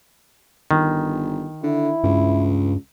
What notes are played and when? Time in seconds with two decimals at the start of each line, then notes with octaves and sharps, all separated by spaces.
0.71 G1 D#3
1.63 D3 E4
2.04 C#2 G2